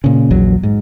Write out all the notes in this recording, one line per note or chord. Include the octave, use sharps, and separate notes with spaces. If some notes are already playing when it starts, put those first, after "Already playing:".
A#2 C#3
A#1 E2 F#3
G#2